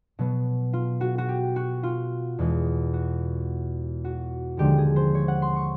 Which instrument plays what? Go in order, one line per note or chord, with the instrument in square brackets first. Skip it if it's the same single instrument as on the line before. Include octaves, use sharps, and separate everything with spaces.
[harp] B2 F#3 B3
F4
F#4
F#4
G4
F#4
F4
E2 B2 G#3
F#4
F#4
D#2 D3 F3 G#3 C4 G4
G#4
C5
C#5
F#5
C6
C#6